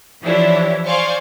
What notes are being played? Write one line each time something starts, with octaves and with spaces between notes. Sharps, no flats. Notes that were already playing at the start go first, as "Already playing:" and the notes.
E3 F3 D4 E4 G4 C#5
C5 D5 F5 G#5 C#6